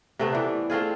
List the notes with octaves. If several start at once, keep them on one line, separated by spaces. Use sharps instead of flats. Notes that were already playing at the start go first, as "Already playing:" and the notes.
C3 A3 B3
E3 D4
A3 C4 F4 G#4